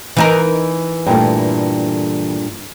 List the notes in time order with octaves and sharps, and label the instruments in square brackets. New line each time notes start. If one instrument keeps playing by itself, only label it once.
[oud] E3 D#4 A#4
[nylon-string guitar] G2 A#2 A3